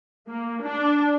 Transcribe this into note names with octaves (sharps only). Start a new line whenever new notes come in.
A#3
D4